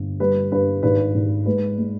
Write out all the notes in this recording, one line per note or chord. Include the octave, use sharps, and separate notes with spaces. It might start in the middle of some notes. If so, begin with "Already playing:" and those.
Already playing: G1
G3 B4
G2 B4
G#1 B4
G#1
G#3 B4
G#3